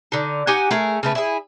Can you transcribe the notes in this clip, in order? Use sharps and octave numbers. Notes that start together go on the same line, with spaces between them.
D3 D#4
D#4 G4 F#5 G#5
A3 G#4 A#4
C#3 A3 B4
E4 G#4